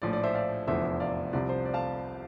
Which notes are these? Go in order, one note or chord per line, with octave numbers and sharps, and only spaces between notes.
A#1 A2 F3 D5
D5
C5 E5
D5 F5
F1 E2 D3 F3 C5 E5
D5 F5
C2 C3 F3 D5
C5
D5
F5 A5